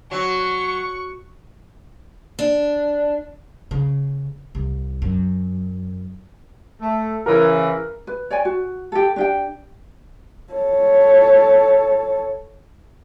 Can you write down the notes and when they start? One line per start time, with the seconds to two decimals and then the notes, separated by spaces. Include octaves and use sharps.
0.11 F#3 C#6
2.39 D4
3.71 C#3
4.55 C2
5.02 F#2
6.80 A3
7.26 C#3 E3 A#4
8.07 B4
8.30 C#5 D5 G5 G#5
8.45 F#4
8.92 G4 A4
9.16 D4 G4 G5
10.53 A4 C#5